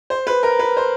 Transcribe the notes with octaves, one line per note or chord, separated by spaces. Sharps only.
C5
B4
A#4
B4
C5